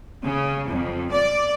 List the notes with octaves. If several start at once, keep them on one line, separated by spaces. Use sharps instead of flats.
C#3
F2
D5